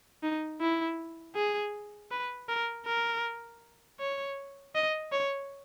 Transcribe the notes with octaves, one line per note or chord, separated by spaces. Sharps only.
D#4
E4
G#4
B4
A#4
A#4
C#5
D#5
C#5